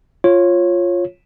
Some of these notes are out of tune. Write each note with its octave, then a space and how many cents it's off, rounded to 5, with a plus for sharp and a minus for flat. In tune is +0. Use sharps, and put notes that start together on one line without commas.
F4 +0 C#5 -15